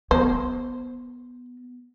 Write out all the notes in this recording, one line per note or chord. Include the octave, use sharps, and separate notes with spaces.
B3 C5